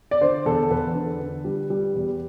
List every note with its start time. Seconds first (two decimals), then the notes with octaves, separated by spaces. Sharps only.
0.11 D5
0.21 D3 C5
0.46 E2 A4
0.70 E2 B4
0.95 D3
1.21 D3
1.45 G3
1.70 G3
1.95 E2